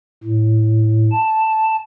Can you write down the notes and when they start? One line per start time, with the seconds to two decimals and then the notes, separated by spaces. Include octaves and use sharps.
0.24 A2
1.12 A5